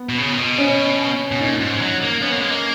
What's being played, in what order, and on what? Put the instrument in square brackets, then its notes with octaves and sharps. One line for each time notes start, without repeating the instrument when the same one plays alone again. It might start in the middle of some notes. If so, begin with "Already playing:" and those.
Already playing: [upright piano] B3
[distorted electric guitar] B2
C#3
A#2
B2
[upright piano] C#4
[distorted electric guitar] B2
[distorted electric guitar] A#2 [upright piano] D#4
[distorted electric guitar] G#2
G#3
F#3
A#3
[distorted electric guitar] B3 [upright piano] C#4
[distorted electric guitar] A#3
G#3
A#3